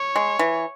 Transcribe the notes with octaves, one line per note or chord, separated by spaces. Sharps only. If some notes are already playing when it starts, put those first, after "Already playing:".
Already playing: C#5
G#3
E3